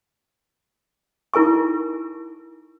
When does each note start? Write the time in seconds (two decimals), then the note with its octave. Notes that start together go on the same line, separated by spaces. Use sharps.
1.34 D#4 E4 A#4 G#5 C#6